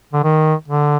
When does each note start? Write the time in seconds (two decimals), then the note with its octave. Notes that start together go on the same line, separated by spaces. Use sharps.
0.13 D3
0.24 D#3
0.68 D3